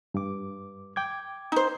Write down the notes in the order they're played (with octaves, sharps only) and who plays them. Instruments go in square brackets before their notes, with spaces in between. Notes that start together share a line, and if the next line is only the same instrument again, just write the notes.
[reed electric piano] G2 D6
G5 D6 G#6
[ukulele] D#4 C5